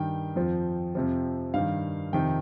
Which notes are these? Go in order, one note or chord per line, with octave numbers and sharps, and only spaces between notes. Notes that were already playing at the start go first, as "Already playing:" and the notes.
Already playing: G2 D#3 G5
F2 F3
F2 C3 F3
G2 D#3 F5
F2 C3 D#3 G5